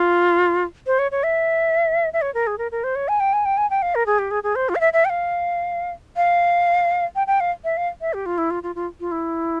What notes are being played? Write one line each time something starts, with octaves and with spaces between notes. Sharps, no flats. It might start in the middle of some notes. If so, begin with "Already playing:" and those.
Already playing: F4
C5
C#5
C#5
E5
E5
C#5
A#4
G#4
A#4
A#4
C5
C#5
G#5
G5
G#5
G5
G#5
G5
F5
A#4
G#4
G4
G#4
G#4
C5
F4
F5
E5
E5
G5
F5
F5
G5
G5
F5
E5
F5
E5
G4
F4
E4
F4
F4
F4
F4
E4